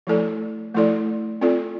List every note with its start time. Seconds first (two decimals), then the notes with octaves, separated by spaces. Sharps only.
0.07 F3 A3 E4 A4 D5
0.74 F3 A3 E4 A4 D5
1.41 C4 F4 A4 D5